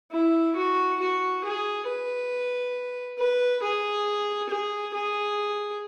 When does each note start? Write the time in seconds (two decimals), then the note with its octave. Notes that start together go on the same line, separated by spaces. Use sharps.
0.12 E4
0.56 F#4
1.00 F#4
1.44 G#4
1.87 B4
3.18 B4
3.62 G#4
4.49 G#4
4.94 G#4